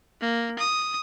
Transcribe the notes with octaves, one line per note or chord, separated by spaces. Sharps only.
A#3
D#6